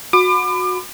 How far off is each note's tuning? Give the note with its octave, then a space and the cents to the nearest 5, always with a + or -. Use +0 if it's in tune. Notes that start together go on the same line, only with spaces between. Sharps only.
F#4 -20 B5 +30 D6 +35